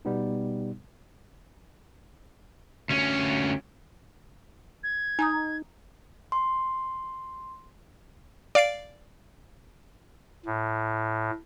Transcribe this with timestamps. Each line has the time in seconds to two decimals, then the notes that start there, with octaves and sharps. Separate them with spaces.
0.05 B2 G3 B3 D#4
2.90 D2 C#4
4.84 G#6
5.19 D#4 G#5 A#5 D#6
6.32 C6
8.55 D5 F5 C7 D7
10.46 A2